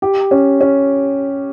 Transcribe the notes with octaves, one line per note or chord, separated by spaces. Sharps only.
G4
C#4
C#4